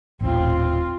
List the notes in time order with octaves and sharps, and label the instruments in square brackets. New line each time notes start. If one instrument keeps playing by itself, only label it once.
[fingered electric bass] D#1 A1 [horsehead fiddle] C4 F4